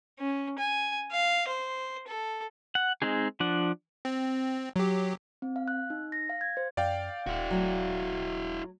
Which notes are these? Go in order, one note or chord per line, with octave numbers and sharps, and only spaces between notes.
C#4
G#5
F5
C5
A4
F#5
G#3 C4 D#4 G#4
F3 D4 F#5
C4
F#3 G4
C4
F5
F#6
D#4
A#6
F5
G#6
C5
F#2 D5 F5 G5
D#1 E4 F#4
F#3 A3